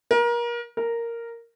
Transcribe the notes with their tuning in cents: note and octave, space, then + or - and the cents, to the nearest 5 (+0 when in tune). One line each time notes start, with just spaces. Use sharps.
A#4 +30
A#4 -5